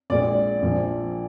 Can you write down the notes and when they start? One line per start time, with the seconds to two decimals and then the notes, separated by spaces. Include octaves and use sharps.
0.10 A#1 A#2 G#3 D5
0.62 A#1 A#2 F3